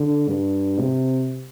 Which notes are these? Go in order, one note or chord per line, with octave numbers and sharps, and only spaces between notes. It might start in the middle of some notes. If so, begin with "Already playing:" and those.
Already playing: D3
G2
C3